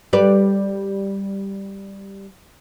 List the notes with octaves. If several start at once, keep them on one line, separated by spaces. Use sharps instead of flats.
G3 B4 D5